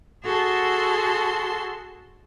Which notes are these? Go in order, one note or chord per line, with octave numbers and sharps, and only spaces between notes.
F#4 G#4 A4 A5 C6